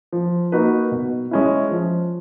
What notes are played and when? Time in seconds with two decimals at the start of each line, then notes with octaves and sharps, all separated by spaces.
0.12 F3
0.52 A#3 D#4 F#4 B4
0.92 B2
1.31 G#3 C#4 E4
1.71 F3